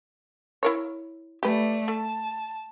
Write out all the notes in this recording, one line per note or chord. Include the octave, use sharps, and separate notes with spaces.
E4 A#4 C#5
A3 G4 B4 D5
A3 A5